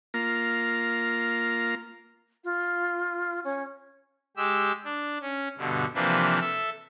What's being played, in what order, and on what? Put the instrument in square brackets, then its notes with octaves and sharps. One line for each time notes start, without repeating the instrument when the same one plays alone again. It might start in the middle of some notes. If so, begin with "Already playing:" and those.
[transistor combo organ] A#3 F4 A#5
[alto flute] F4
C#4
[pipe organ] G#3 G4 E6
D4
C#4
G2 B2 D3
C3 E3 F3 A#3 D4 B4
A4 E5